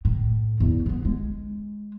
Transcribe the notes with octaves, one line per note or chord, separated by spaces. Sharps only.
A2
E2
D2 B3
G#3